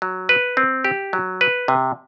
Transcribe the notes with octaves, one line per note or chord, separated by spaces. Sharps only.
F#3
B4
C4
G4
F#3
B4
C3